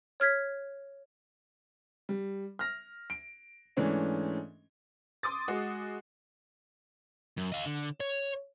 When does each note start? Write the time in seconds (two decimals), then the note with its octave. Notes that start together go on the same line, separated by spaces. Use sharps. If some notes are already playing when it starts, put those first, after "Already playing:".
0.20 C#5 F6 G#6 B6
2.09 G3
2.59 F6 A#6
3.10 D7
3.77 G#2 E3 A3 C#4 D4
5.23 C6 D6 D#6 A6
5.48 G#3 F#4
7.37 F#2
7.52 D#5 F5
7.65 D3
8.00 C#5